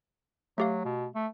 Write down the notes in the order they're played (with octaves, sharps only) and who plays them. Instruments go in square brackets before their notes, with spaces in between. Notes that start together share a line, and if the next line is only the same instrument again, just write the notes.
[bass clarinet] F#3 [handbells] A3 G4 F5
[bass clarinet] B2
A3